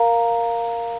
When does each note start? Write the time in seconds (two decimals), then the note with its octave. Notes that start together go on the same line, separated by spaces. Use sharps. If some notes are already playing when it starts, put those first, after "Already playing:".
Already playing: A#4 F5 A#5